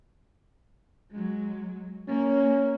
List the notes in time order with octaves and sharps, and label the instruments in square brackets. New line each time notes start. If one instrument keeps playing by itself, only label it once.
[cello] F#3 G#3
[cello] A#3 [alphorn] C#4